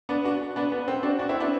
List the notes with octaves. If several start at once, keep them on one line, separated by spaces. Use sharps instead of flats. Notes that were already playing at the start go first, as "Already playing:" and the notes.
B3 D4
D4 F#4
B3 D4
B3
C4
D4 F#4
D4 F#4
C4 E4
B3 D4